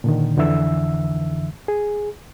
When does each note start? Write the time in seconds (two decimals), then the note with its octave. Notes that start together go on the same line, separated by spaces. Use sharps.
0.04 A#2 D3 D#3
0.37 F2 D3 E3 E5 E6
1.68 G#4